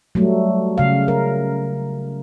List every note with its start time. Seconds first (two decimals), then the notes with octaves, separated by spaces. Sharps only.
0.15 F#3 G3 A3
0.78 C#3 F5
1.08 A#4